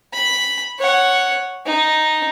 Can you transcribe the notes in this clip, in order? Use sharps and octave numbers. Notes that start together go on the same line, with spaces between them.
B5
C#5 F#5
D#4